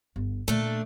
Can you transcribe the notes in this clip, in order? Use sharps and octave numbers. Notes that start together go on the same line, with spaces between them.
G1
A#2 D3 A3 D4